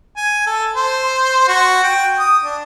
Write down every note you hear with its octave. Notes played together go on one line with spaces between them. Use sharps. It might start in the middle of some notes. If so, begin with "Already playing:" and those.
G#5
A4
C5
F#4
G5
D#6
D4